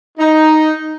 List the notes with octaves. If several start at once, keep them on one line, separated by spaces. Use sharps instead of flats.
D#4